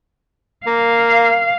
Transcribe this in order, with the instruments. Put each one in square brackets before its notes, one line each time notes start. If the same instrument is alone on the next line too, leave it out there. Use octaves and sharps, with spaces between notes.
[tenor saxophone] A#3 [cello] F5